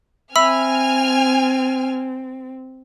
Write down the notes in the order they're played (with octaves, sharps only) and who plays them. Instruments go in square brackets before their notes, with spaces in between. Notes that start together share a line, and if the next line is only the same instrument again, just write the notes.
[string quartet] C4 [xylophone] E5 B5 E6 [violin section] G#5 F6